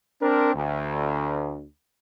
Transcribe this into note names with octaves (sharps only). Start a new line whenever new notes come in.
C4 D4 A#4
D2